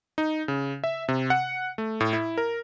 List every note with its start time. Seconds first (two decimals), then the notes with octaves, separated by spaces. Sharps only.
0.18 D#4
0.48 C#3
0.84 E5
1.08 C3
1.30 F#5
1.78 A3
2.00 A2
2.13 E4
2.38 A#4